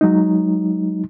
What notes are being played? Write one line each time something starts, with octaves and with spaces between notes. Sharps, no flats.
F#3 G#3 D#4